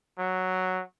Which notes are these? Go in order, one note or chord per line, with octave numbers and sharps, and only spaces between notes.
F#3